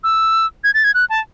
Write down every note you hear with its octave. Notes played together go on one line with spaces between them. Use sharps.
E6
G#6
A6
G#6
F#6
A5